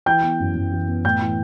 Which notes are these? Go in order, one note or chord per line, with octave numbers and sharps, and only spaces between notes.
E3 G5 G6
B3
F#2
F#2
E3
B3
A2 G5 G6
E3